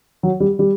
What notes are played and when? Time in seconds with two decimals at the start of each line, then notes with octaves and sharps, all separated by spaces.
0.23 F#3
0.40 G3
0.59 G3